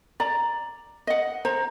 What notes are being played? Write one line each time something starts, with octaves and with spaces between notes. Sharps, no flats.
D5 A#5
D#5 F#5
C5 A#5